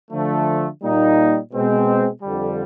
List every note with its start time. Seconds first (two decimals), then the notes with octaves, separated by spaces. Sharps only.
0.11 D3 F3 A3
0.81 A#2 G3 A#3 D#4
1.52 B2 G#3 C4
2.22 F2 D3 G3